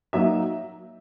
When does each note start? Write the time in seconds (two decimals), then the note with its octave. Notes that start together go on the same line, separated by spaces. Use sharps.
0.13 F#3 A#3 D#4 E5